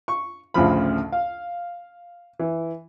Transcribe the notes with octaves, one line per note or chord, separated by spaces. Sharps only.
C#6
A1 D2 C#3 F3 B5
F5
E3